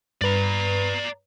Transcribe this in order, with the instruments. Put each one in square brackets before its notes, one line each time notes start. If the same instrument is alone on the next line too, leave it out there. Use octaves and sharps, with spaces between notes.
[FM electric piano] G2 B4 [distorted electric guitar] D5 A#5